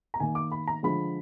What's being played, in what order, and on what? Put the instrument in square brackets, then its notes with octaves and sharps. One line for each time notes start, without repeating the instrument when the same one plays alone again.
[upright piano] A#5
D#3 A#3 G#5
D6
B5
A#5
D3 F3 G#3 B5